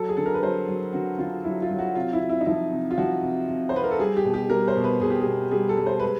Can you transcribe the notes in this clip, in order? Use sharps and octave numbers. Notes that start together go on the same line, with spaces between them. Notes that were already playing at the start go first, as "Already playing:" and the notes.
Already playing: F#3 A4
G#4
D3 A4
A#4
B4
F#3 C5
F#3
D3 F#4
D3 F4
F#3 E4
F4
F#3
F#4
C3 F4
E4
C3
E4
D#4
F3 E4
C3
F4
F3 F#4
C3
C3
C5
C3 B4
A#4
A4
G3 G#4
G4
B2
G4
G3 A#4
C5
B2
B4
B2 G#4
G4
B2 G#4
G3 G#4
A4
G3
C5
G#3 B4